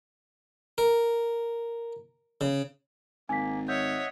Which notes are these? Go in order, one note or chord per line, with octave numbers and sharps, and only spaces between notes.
A#4
C#3
G#1 A#3 G#5 B6
C#5 D#5 E5 F#5 G6